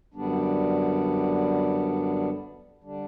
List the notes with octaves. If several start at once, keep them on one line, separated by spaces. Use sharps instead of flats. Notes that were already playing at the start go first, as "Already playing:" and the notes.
F#2 D3 G3 B3 D4
D3 G3 D4